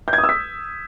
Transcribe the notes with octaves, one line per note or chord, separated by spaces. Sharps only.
G6
G#6
D#6
E6
B6